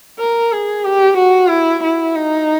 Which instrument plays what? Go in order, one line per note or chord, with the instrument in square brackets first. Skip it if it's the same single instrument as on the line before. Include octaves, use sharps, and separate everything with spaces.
[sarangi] A#4
G#4
G4
F#4
E4
E4
D#4